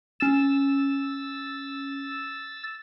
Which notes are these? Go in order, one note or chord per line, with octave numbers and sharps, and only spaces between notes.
C#4 E6 A6 E7